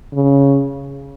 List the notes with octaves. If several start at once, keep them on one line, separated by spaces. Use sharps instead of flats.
C#3